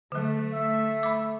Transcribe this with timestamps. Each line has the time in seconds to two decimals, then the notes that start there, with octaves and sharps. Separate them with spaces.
0.12 D3 F#3 A3
0.52 E5
1.03 B5 D6